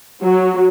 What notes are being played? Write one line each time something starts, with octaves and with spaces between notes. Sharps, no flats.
F#3